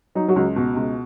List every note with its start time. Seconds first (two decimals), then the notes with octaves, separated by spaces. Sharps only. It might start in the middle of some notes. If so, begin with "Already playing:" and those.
0.15 F#3 D#4
0.28 F#3 F#4
0.36 C#2
0.56 B2
0.76 C#2